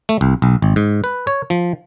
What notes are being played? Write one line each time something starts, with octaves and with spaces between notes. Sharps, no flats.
A3
C2
B1
G#1
G#2
B4
C#5
F3